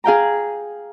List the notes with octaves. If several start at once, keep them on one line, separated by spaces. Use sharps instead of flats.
G#4 F5 G5 A#5